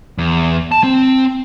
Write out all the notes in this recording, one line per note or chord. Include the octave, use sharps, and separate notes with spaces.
E2
A5
C4